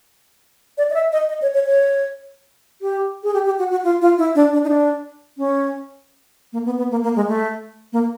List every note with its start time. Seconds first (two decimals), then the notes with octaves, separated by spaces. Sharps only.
0.78 D5
0.90 D#5
0.94 E5
1.12 D#5
1.29 D#5
1.42 C#5
1.54 C#5
1.67 C#5
2.82 G4
3.23 G#4
3.34 G4
3.45 G4
3.59 F#4
3.71 F#4
3.84 F4
4.02 F4
4.18 E4
4.35 D4
4.53 D4
4.64 D#4
4.69 D4
5.38 C#4
6.53 A#3
6.65 B3
6.78 B3
6.91 A#3
7.03 A#3
7.16 G#3
7.28 A3
7.93 A#3